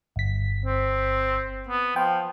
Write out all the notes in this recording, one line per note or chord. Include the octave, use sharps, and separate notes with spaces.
G1 B6
C4
B3
F3 G5